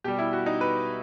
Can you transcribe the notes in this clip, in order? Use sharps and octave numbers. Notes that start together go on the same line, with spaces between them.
B2 G3 G4
E4
F#4
D#4
B4